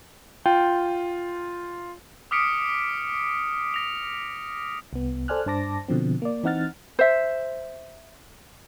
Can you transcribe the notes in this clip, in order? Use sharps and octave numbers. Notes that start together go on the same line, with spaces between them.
F4 G5
D6 D#6 F6 B6 C#7 D7
A#6 F7
C2 B3
A4 C5 D5 G#5 F6 F#6
G2 D4 C5 A5 D6 A#6
B2 D3 F3 C4
A#3 D5
E3 C4 D#4 F#5 F6 A6
C5 E5